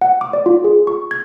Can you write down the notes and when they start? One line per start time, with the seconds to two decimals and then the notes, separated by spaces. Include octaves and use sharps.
0.01 F#5
0.21 D6
0.33 D5
0.46 F4
0.64 G#4
0.87 C#6
1.11 G#6